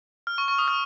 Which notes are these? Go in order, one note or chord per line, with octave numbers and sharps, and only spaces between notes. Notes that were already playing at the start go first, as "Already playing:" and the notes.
F6
C#6
C#6
D#6
F6